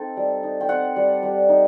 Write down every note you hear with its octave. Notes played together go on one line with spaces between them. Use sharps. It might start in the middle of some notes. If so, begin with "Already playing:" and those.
Already playing: C4 D#4 A4
G3
D#4
G5
C4 F#5
G3
G3
D#4